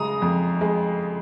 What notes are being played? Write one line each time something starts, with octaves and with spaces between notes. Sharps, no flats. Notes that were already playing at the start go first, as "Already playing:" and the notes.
Already playing: C#3 G#3 A#5 D#6
F2
G#3